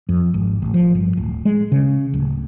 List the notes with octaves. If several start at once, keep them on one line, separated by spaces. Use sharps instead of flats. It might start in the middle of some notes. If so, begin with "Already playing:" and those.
F2
G#1
A1
F3
G1
D1
G#3
C#3
D1